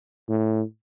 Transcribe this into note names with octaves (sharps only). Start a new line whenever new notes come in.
A2